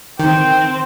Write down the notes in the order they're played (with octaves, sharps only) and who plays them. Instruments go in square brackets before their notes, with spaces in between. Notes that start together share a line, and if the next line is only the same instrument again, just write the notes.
[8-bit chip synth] D#3 [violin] C4 C5 [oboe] G5